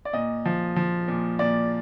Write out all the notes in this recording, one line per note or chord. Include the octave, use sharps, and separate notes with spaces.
D5
A#2 D#5
F3
F3
A#2
A#2 D5